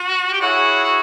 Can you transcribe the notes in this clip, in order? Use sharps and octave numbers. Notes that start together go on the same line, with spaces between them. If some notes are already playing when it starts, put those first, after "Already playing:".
Already playing: F#4
G4
E4 F#4 G#4 C#5 F#5
F#4